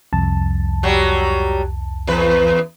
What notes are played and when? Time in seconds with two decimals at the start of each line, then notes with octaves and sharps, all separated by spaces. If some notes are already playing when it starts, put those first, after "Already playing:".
0.13 C2 F2 A5
0.83 F#3 G3
2.07 E2 B4